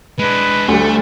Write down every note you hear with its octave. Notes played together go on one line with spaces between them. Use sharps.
G#3 D4 B4
D2 G3 A3